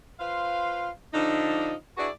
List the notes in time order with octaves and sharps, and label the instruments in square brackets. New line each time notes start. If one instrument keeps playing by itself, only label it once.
[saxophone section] F4 B4 C5 F5
D3 F3 D4 D#4
D4 E4 F#4 G#4 B4 D5